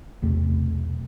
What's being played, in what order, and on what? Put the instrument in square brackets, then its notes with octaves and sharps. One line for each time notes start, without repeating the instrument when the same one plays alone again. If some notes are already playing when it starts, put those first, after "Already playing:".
[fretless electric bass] B1 E2 C3 A3